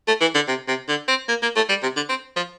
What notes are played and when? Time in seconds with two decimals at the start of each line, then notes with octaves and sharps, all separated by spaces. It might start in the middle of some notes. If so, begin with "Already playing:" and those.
0.08 A3
0.21 E3
0.35 D3
0.48 C3
0.68 C3
0.88 D3
1.08 C4
1.29 A#3
1.42 A#3
1.56 A3
1.69 G3
1.83 C3
1.96 D3
2.09 C4
2.36 F3